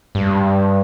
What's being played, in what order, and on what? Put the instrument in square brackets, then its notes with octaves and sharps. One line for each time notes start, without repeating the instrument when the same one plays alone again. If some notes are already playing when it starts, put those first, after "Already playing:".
[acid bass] G2